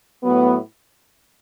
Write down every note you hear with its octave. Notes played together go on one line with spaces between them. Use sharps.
A2 F#3 B3